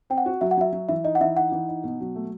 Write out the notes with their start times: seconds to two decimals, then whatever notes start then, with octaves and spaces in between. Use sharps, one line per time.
0.10 C4 G5
0.18 F#5
0.26 F#4
0.41 F#3 E5
0.51 F#5
0.57 F#3 E5
0.73 F#3
0.89 E3 E5
1.04 D#4 D#5
1.15 F#5
1.21 E3 E5
1.37 D#4 F#5
1.52 E3
1.68 D#4
1.84 B2
2.01 F#3
2.16 A3